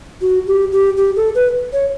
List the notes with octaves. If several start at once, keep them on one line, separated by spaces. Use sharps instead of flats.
F#4
G4
G4
G4
A4
B4
C#5